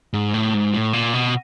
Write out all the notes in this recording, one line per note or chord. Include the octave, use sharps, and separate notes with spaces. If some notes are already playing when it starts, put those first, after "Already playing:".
G#2
A2
G#2
A2
A#2
B2